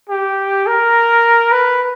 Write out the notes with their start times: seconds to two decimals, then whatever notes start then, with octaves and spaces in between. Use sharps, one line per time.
0.09 G4
0.67 A#4
1.52 B4